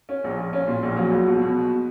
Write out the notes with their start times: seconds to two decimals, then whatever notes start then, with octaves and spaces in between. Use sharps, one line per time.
0.09 C#4
0.24 A#1
0.38 A#1
0.53 C#4
0.68 A#2
0.83 A#1
0.97 F#3
1.12 C#2
1.27 B2
1.41 B2